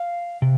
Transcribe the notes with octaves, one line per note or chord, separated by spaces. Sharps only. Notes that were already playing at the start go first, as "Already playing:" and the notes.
Already playing: F5
C3